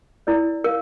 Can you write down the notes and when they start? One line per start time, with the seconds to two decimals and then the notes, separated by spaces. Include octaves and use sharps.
0.27 E4 A#4 D5
0.64 A#4 F5